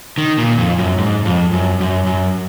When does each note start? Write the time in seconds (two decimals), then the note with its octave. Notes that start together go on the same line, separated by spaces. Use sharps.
0.18 D#3
0.38 A#2
0.58 F2
0.78 F#2
0.98 G#2
1.25 F2
1.53 F#2
1.80 F#2
2.07 F#2